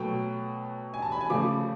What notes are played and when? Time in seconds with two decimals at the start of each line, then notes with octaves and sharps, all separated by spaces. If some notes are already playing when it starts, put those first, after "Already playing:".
Already playing: B2 F#3 A3 G5
0.94 G#5
1.02 A5
1.12 B5
1.21 G#5
1.30 C#3 F3 A3 D6